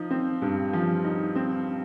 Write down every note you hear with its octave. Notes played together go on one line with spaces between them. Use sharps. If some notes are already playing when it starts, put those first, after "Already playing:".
Already playing: F3 D#4
C4
G2
F3
D#4
C4